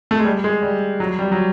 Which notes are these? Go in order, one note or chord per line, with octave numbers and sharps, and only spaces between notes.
A3
G#3
G3
G#3
G3
F#3
G3
F#3